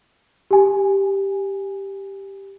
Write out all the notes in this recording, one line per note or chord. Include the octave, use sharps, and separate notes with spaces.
G4 G#5